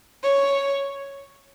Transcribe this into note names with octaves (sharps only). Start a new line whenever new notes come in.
C#5